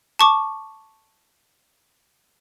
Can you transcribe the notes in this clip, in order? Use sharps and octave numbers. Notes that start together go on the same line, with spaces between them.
A5 C#6 D6